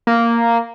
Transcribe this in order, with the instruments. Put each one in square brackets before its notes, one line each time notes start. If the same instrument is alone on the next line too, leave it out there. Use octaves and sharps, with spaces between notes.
[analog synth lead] A#3